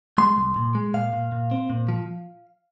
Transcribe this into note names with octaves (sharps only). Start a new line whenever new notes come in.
G#3 C6
C2
A#2
G#3
A#2 F5
A#2
A#2
C4
A#2
F3